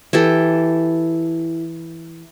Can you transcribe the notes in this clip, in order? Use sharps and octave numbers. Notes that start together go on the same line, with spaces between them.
E3 E4 G4 A4